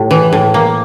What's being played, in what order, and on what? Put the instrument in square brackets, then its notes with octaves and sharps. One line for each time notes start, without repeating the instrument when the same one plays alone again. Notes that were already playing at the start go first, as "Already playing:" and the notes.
Already playing: [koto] A2 G4
E3
A2
A#3